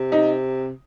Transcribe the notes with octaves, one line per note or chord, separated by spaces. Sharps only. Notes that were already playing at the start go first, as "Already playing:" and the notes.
Already playing: C3
D#4